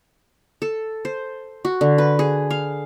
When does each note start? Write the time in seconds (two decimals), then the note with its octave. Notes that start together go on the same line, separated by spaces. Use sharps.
0.62 A4
1.05 C5
1.65 F#4
1.81 D3
1.98 B4
2.19 G#4
2.50 F5